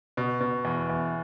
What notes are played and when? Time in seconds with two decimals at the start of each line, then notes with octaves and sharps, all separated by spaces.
0.17 B2
0.41 B2
0.65 E2
0.90 E2